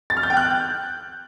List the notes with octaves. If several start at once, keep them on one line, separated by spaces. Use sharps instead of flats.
A6
F6
G6
G5
F#6